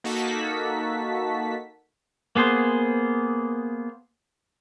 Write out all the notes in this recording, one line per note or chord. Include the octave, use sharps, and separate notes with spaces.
A#3 D#4 F#4 A4 A5 B6
A#3 B3 G#4 C5